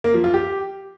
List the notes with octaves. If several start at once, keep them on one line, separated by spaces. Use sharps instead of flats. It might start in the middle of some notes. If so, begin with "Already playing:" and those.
A#3
F3
F4
G4